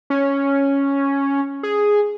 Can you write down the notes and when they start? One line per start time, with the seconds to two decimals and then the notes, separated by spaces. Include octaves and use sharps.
0.10 C#4
1.63 G#4